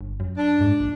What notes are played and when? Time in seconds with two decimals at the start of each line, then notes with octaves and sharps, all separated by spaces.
0.01 G1
0.20 F#2
0.37 D4
0.61 G#2
0.80 A#1